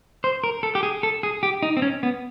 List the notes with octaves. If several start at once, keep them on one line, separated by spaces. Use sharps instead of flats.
C5
A#4
A4
G4
G#4
A4
G#4
G4
D#4
C4
C#4
B3